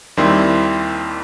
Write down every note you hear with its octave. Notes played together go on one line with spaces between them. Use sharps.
D#2 D#3 G3 C4 E4 C6